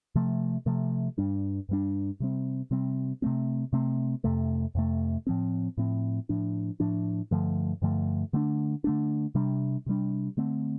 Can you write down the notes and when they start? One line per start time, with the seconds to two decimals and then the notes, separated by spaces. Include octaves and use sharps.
0.15 C3 F3 A3
0.66 C3 F3 A3
1.18 G2 G3 D4
1.69 G2 G3 D4
2.20 C3 G3 C4
2.71 C3 G3 C4
3.22 C3 A3 C4
3.73 C3 A3 C4
4.24 F2 C3 A3
4.75 F2 C3 A3
5.27 A2 F3 C4
5.78 A2 F3 C4
6.29 A2 F3 D4
6.80 A2 F3 D4
7.31 G2 D3 F3 A3
7.82 G2 D3 F3 A3
8.33 D3 A3 D4
8.84 D3 A3 D4
9.35 C3 G3 D4
9.86 C3 G3 D4
10.37 D3 A3 C4